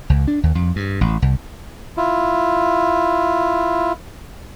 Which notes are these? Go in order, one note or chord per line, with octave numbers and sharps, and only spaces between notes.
C#2
D4
D#2
F2
G2
A1
C2
E4 F4